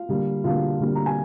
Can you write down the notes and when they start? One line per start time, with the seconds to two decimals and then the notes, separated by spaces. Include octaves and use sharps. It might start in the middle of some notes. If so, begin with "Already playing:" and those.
Already playing: F4 F5
0.09 D3 G3 A#3
0.44 D3 G3 A#3 F4 F5
0.80 D3 G3 A#3
0.95 A#5
1.06 G#5